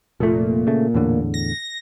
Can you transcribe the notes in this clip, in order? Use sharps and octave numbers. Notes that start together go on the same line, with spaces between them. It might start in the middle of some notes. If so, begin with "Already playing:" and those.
F1 A#2 A3
C#3 A3
E2 A2 D3
A#6